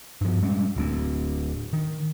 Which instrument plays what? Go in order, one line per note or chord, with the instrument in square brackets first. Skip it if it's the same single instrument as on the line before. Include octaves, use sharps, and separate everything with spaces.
[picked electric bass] G2 F3
G3 G#3 C#4
D1 D2
D#3